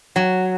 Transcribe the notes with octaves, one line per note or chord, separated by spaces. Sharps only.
F#3